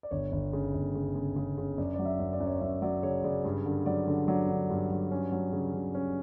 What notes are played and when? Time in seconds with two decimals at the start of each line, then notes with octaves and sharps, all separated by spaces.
0.03 D5
0.11 G1 C#5
0.32 G1
0.53 C#3
0.74 G1
0.95 C#3
1.15 C#3
1.36 C#3
1.58 C#3
1.78 F#2 D5
1.95 F#3 D5
2.05 E5
2.20 F#2
2.33 D5
2.40 F#2
2.47 C#5
2.54 D5
2.61 F#2 E5
2.82 F#3 D5
3.03 C#3 C#5
3.24 C#3 D5
3.44 G2
3.66 D3
3.86 F#3 D5
4.07 D3
4.28 F#3 D5
4.49 D3
4.70 G2
4.90 F#3
5.11 C#4
5.32 F#3
5.53 C#3
5.73 C#3
5.95 C#4